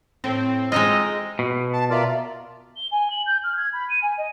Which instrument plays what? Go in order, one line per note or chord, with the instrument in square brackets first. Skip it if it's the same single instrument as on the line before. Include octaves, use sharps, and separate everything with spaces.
[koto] A2 [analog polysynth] C4
[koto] G#3 D#4 F4 [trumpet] D#5
[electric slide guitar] B2
[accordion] A5
[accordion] F4 D5 [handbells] A#4 E5 A#5
[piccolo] G7
G#5
F#7
G6
F6
G#6
B5
D#7
G#5
D#5